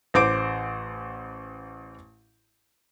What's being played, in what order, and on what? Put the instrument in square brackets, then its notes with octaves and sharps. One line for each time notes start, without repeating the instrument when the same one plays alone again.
[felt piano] A1 C5 D6 D7